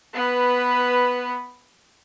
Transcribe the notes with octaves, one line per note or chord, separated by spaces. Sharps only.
B3 B4